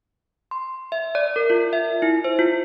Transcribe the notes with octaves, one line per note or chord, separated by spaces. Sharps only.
C6
E5
D5
A#4
F4
E5
E4
C5
F4